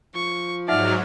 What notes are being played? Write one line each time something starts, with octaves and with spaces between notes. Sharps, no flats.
F3 C#6
G#2 F#3 D#4 D5 E5 F#5 F6